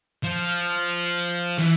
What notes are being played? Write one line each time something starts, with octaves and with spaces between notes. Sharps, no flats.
F3
E3